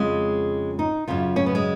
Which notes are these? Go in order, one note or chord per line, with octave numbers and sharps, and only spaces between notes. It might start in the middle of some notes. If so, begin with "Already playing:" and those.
Already playing: F2 C#3 G#3
D#4
F#2 C#3 F4
C#4
B3
G#3